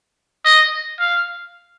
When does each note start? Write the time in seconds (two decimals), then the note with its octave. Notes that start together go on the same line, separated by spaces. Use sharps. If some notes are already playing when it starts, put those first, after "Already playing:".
0.45 D#5
1.00 F5